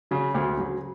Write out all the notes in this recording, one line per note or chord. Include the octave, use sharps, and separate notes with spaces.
C#3 F#3
D2
C#3 F#3